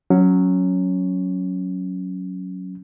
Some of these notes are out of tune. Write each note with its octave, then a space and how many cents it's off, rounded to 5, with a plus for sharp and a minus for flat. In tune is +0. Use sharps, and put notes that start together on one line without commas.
F#3 +0 C#4 +0